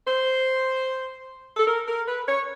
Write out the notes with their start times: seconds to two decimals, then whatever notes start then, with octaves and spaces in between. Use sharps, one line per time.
0.06 C5
1.57 A4
1.67 A#4
1.87 A#4
2.07 B4
2.27 C#5